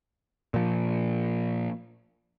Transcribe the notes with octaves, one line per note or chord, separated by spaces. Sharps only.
A#2 F3